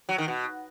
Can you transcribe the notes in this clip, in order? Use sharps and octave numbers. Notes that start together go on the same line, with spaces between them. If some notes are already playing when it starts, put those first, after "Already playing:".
F#3
D#3
B2